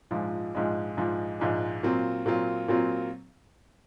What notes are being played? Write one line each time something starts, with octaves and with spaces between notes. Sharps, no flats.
A#1 G#2 F3 G#3
A#1 G#2 F3 G#3
A#1 G#2 F3 G#3
A#1 G#2 F3 G#3
A#2 F#3 C4 F4
A#2 F#3 C4 F4
A#2 F#3 C4 F4